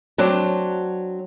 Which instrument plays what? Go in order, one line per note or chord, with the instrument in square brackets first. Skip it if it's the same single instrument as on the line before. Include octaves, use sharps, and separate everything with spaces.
[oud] F#3 C4 D4